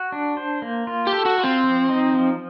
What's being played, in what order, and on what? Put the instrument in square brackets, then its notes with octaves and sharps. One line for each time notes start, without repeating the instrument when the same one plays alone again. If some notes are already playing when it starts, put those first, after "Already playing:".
Already playing: [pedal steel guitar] F#4
D4
C5
A#3
F4
[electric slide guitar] G4
[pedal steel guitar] A4
[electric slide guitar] F#4
[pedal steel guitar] F4
[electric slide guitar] C4
[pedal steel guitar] F3
D#4
F3